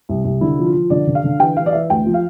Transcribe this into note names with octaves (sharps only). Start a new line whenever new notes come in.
C2
C2
D3 E4
F3
F4
F3
D3 D5
D3
F5
D3
E3 G5
E3 F5
D5
E3 E5
D2 G5
F3
F5